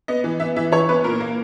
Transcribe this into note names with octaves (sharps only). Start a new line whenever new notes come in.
B3 D#5
E3
B3 E5
E3 E5
E3 C#5
B3 B4
A#2 A#4
A#3